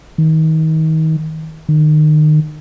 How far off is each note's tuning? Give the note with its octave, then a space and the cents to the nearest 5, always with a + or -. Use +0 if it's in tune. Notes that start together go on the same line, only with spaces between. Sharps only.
D#3 +30
D#3 -30